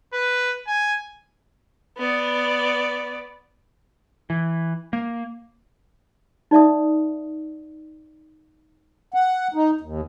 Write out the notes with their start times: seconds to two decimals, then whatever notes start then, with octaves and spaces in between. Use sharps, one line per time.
0.13 B4
0.67 G#5
1.98 B3 D5
4.30 E3
4.93 A#3
6.51 D#4 D5 E5 D#6
9.14 F#5
9.54 D#4
9.81 D#2